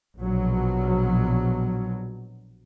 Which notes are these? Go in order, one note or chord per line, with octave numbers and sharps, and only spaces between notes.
A#1 B2 F#3